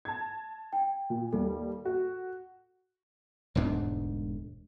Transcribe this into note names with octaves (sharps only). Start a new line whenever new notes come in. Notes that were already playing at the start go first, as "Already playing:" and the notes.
A5 G#6
G5
A#2
D#2 G3 A4
F#4
E1 D2 G#2 D4